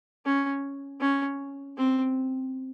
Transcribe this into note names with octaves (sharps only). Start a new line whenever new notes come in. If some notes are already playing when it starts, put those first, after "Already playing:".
C#4
C#4
C4